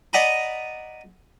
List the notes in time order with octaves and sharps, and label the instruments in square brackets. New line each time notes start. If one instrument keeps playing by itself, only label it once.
[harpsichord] D5 D#5 F#5 G#5 A#5 B5